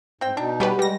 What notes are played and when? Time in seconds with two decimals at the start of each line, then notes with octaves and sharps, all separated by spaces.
0.21 G#2 C4 G5
0.37 B2 D4 D#4
0.60 G3 B3 C#4 G4 G#4 B4
0.79 G3 G#3 A#6